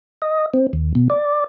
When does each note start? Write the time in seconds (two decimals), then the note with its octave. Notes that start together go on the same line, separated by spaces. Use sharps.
0.22 D#5
0.54 C4
0.73 D#2
0.95 B2
1.10 D5